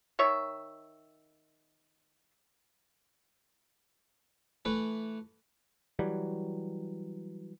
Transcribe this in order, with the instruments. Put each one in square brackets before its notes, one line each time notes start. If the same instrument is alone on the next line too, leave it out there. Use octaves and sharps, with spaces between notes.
[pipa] D#3 C#5 E5
[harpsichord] E3 A3 B4
[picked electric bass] E3 F#3 G3